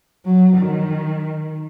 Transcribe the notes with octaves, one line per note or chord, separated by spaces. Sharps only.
F#3
D#3